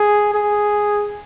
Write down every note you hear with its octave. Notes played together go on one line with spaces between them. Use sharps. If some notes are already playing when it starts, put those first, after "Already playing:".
Already playing: G#4
G#4